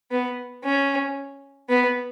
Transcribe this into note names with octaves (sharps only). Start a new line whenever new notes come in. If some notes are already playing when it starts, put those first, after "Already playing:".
B3
C#4
B3